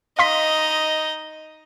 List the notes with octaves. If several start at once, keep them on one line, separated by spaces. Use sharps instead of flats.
D#4 D#5 F5 C6 B6